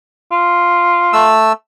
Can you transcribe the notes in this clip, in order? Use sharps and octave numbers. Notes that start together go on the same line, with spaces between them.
F4
A3 E6